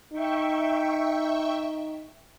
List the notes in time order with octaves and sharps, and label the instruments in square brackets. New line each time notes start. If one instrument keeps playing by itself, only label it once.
[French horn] D#4 [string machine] E5 G5 C#6